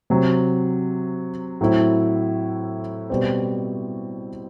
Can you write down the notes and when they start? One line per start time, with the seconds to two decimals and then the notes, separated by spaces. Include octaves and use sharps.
0.10 C3 F#3 C4
1.61 A2 F#3 C4 E4
3.10 B2 G3 C4